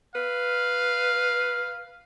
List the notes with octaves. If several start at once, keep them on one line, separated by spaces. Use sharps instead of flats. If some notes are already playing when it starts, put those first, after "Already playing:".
B4 F5